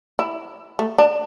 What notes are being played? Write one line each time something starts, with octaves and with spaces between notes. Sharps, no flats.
E4
A3
D4